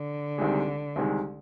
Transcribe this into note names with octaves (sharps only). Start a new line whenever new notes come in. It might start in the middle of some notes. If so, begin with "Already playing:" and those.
Already playing: D3
C2 C3 D#3 G#3
C2 C3 D#3 G#3